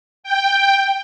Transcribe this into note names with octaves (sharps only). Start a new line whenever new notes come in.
G5